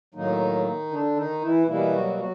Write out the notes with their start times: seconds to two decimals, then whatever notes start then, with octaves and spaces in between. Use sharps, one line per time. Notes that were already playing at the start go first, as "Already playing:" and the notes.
0.14 A2 D#3 F#3 A#3 D#4
0.91 D3 D4
1.16 D#3 D#4
1.41 E3 E4
1.67 B2 E3 G3 A#3 E4
1.93 F#3 F#4
2.18 F#3 F#4